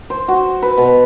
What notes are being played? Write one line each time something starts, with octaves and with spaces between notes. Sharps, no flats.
C5
F#4
B4
B2